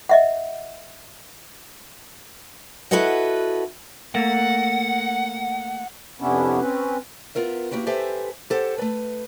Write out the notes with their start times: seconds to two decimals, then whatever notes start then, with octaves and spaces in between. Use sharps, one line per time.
0.09 D#5 E5 F#5
2.91 E4 F#4 A4 B4 D#5 F#5
4.15 A3 A#3 F#5
6.20 F2 C3 B3 C#4 D4 E4
6.60 C4 C#4 B4
7.35 B3 F4 A#4 E5
7.71 A#3 E4 F#4 G4 B4
7.87 G4 A4 B4 C5 E5 G#5
8.50 G4 A4 C5 F#5
8.78 A3 B4